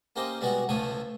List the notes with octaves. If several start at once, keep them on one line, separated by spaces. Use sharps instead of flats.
A#3 C#4 G4 C5 D#5
G3 G#3 B3 F#4 F#5
C#2 A2 F3 A3 C#5 D#6